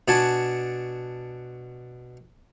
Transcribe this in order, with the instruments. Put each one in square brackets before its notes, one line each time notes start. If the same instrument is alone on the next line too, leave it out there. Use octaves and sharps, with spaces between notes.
[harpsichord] B2 D4 F#4 G#5 A5